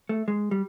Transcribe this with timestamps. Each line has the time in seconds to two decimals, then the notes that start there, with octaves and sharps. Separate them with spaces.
0.09 A3
0.28 G#3
0.51 G3